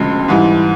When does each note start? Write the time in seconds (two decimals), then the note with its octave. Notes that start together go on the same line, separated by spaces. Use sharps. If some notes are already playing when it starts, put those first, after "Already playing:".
Already playing: E1 D2 C#3 F3 G#3
0.28 G#2 E3 G3